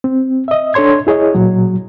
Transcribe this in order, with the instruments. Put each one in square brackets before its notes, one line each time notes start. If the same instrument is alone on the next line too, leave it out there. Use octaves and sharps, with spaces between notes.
[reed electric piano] C4
D#5 E5
D4 A4 C#5 C6 G#6
E4 G#4 C#5 D#5
A#2 F#3